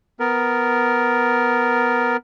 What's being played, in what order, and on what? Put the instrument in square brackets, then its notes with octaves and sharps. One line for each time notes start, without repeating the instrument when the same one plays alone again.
[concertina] B3 A#4